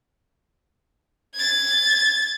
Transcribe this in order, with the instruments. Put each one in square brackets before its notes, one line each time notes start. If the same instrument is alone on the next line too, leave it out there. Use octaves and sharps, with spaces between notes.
[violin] G#6 A6